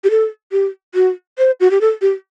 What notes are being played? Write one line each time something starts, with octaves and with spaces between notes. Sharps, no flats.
G4
A4
G4
F#4
C5
F#4
G4
A4
G4